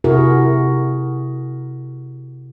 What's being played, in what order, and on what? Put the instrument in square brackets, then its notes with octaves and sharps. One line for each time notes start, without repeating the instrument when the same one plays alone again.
[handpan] C3 E4 F#4 G#4 A#4